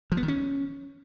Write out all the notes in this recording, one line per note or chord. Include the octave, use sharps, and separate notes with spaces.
F3
B3
D#3
C#4